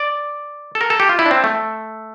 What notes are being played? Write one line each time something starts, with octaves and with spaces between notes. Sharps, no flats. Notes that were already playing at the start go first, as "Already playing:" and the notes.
Already playing: D5
A4
A#4
A4
G4
F4
E4
D4
C4
A3